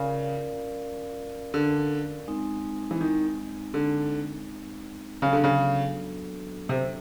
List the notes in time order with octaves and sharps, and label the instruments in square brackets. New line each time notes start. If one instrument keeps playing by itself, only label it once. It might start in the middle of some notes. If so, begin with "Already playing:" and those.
Already playing: [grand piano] C#3 [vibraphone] C#4 F4 A#4 D5 F5
[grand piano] D3
[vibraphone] G#3 C4 D#4
[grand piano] E3
D#3
D3
[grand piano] C#3 [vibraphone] F#3 B3 D4 F#4 A4
[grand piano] D3
C#3
C3